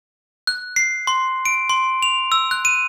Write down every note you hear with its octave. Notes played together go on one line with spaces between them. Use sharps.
F#6
C7
C6
D7
C6
F7
E6
F#6
D#7